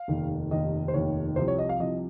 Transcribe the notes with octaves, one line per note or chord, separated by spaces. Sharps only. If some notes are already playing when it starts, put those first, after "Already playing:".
Already playing: F5
F1 D#2 D#3
F1 D#2 D#3 D#5
C5
F1 D#2 D#3 C#5
C2 C3 F3 C5
C#5
D#5
F5
C2 C3 F3 D#5